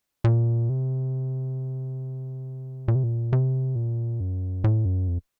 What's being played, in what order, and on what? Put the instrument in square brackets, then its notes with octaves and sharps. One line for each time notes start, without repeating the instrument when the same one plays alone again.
[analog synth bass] A#2
C3
A#2
C3
A#2
C3
A#2
F#2
A2
F#2
F2